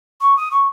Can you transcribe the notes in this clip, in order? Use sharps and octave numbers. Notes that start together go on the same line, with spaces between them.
C#6
D#6
C#6